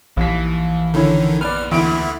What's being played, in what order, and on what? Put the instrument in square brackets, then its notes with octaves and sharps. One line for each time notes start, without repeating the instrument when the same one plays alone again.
[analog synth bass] A#1 [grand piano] D#2 B6 [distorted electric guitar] E3
[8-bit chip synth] D3 D#3 [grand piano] C#4 E4
[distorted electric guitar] D#2 B3 [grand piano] B4 D5 [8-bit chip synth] F6
[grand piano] D2 F#5 D7 [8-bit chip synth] E3 E4